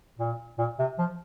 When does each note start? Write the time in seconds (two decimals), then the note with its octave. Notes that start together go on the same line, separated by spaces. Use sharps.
0.19 A#2
0.59 A#2
0.79 C3
0.98 F3